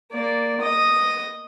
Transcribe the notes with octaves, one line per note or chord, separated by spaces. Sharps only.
A#3 D5
D#5 D#6